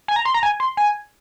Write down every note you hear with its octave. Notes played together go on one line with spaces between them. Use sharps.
G#5
A#5
C6
A#5
G#5
C6
G#5